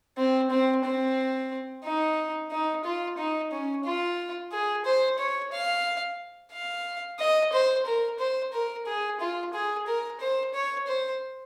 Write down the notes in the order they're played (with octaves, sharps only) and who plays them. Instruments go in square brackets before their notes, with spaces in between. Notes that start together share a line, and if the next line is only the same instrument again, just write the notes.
[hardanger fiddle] C4
C4
C4
D#4
D#4
F4
D#4
C#4
F4
G#4
C5
C#5
F5
F5
D#5
C5
A#4
C5
A#4
G#4
F4
G#4
A#4
C5
C#5
C5